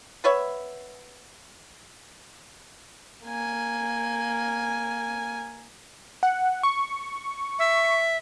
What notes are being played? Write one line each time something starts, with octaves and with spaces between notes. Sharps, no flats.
B3 B4 C#5 E5
A#3 G#5
F#5
C#6
E5